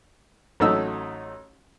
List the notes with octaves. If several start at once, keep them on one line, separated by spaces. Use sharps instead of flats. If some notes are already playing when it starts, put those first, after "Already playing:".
A1 F#3 A3 D#4 E6